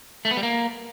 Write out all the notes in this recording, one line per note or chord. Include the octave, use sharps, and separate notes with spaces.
A3
B3
G3
A#3